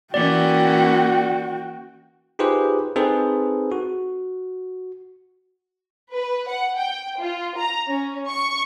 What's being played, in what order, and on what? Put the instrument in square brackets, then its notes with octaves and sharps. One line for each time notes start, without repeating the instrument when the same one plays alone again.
[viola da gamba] E3 A#3 C#4 [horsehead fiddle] F#4 G5 [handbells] D5
[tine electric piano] D#4 F4 G4 G#4 B4 C5
C4 D#4 G#4 A4 B4 C5
F#4
[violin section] B4
F#5
G5
F4
A#5
C#4
C#6